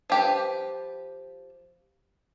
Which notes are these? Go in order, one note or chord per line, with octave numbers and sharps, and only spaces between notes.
F3 G4 B4